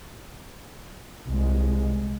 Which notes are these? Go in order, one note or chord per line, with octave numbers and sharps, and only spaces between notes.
C2 G#3